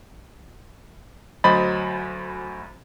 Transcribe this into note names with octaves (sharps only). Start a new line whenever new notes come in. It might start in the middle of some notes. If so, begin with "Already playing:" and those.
D2 F#3 C5 D#5 B5 A6